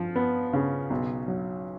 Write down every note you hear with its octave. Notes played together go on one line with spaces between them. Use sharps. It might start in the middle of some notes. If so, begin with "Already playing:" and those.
Already playing: F3
B3
C#3
B1
F#3